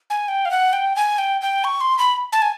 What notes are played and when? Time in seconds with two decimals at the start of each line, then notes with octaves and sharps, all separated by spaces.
0.10 G#5
0.28 G5
0.45 F5
0.51 F#5
0.73 G5
0.96 G#5
1.18 G5
1.41 G5
1.64 C#6
1.81 C6
1.99 B5
2.32 A5
2.42 G#5